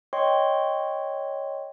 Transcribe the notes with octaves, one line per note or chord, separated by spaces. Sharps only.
C#5 D#5 G5 C6 C#6